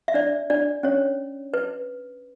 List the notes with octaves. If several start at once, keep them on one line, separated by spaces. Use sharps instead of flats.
E5
D4 D5
D4 D5
C#4 C#5
B4